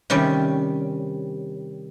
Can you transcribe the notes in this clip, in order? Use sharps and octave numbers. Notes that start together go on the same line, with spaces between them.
C3 D#3 G3 C#4